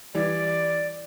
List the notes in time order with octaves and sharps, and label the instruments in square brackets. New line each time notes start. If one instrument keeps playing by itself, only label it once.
[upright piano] E3 G3 [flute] D5